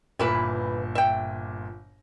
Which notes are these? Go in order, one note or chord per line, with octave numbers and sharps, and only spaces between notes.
G1 A#2 E3 E4 B4
E5 G5